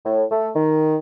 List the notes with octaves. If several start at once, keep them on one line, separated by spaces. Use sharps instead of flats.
A2
A3
D#3